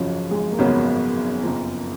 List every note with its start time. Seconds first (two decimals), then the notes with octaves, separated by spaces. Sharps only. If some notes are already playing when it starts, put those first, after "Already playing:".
Already playing: G#1 F#2 C#3 F3 F#3 C#4
0.31 G#3
0.52 A#3
0.58 G#1 F#2 C#3 F#3 B3 C#4
1.43 F#1 F2 F3 A#3